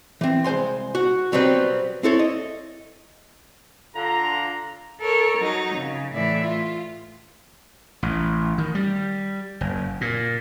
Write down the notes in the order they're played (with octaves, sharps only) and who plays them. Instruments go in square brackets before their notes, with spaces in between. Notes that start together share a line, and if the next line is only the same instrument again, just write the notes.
[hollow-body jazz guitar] E3 C4
C2 G#3 C5 G#5 C6
F#4
B2 F#3 G3 C4 F4 B4
C4 E4 A4 C#5
D#5
[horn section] D3 F4 A#5
[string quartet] A4 A#4 C#5
F#3 D#4
C#3
A2 E3 D5 E5
F4
[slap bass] A1
D#3
G3
F#1
A#2